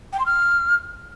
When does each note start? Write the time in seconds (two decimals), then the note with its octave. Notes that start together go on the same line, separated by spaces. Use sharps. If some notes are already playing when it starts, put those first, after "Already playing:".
0.12 G5
0.19 C6
0.25 F6